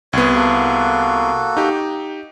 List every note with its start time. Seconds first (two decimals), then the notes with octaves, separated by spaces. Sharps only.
0.13 C2 B3 C#5
0.36 A#3 F#4 A4
1.57 D#4 G4